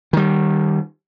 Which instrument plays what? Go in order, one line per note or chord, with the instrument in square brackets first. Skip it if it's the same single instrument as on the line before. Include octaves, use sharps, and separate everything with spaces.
[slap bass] D#3 G3